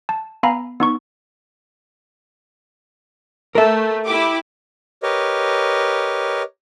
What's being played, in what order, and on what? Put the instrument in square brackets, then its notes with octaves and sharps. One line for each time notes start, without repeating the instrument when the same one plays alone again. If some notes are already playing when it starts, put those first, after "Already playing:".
[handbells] A5
B3 F5 G#5 A#5 B5
B3 D#4 C#6
[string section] A3 [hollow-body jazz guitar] A#4 E5
[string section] E4 G4 D6
[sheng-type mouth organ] G4 A#4 B4 C#5 D#5